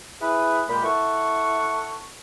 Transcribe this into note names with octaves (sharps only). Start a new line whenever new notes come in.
E4 G#4 B4
A#2 G#3 G4 B5
E4 A4 F#5 A5 C#6